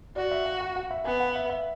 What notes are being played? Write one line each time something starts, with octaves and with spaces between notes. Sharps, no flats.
F#4 D5
E5
F#5
F#5
F#5
E5
B3 G#5
F#5
E5
E5